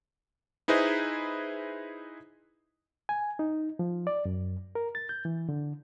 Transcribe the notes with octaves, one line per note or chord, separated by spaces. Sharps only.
D#4 E4 G#4 B4 C5 D#5
G#5
D#4
F3
D5
F#2
A#4
A6
G6
E3
D3